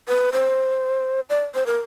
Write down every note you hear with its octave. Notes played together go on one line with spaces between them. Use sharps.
B4
C5
D5
C5
A#4